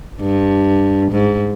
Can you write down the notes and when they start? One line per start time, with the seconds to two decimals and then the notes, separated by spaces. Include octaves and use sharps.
0.21 G2
1.11 G#2